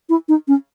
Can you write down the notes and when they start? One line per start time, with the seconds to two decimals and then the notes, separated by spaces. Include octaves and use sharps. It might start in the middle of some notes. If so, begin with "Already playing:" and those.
0.09 E4
0.29 D#4
0.48 C#4